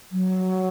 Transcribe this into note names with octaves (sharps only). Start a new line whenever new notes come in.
F#3